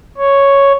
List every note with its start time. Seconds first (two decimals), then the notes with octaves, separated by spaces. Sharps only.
0.18 C#5